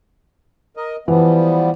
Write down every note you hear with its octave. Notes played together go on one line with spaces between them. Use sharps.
A#4 D#5
E3 F3 G3 B3